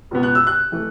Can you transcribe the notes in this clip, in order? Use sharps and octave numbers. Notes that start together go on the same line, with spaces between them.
C#2 B2 B3
F#6
E6
F#6
E3 A3